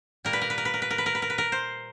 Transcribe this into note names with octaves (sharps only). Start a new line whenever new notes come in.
A#2 G3 A#4
B4
A#4
B4
A#4
B4
A#4
B4
A#4
B4
A#4
B4
A#4
B4
A#4
C5